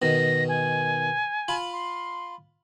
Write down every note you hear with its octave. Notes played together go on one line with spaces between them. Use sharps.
B2 D#3 A#6
G#5
F4 B5
C6